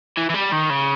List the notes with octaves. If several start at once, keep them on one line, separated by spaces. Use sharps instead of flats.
E3
E3
G3
D#3
C#3